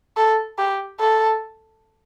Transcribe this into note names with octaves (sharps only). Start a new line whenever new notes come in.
A4
G4
A4